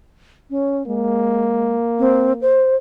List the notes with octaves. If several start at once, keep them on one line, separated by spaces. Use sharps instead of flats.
C#4
G#3 A#3
C4
C5